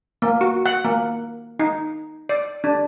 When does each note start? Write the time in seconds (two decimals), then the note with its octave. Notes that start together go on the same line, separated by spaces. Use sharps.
0.22 A#3
0.41 F#4
0.66 F#5
0.85 A#3
1.59 D#4
2.29 D5
2.64 D4